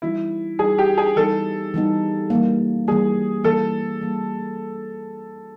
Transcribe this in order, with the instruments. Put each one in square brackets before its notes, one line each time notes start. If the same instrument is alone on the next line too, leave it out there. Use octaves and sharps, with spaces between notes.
[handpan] E3 G3 B3 D#4 [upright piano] E4
[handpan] E3 G3 B3 D#4 [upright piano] G#4
[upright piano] G4
G#4
[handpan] E3 G3 B3 D#4 [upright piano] A4
[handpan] E3 G3 B3 D#4
E3 G3 A#3
[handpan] E3 G3 A#3 [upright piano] G#4
[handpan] E3 G3 A#3 [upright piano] A4
[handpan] E3 G3 A#3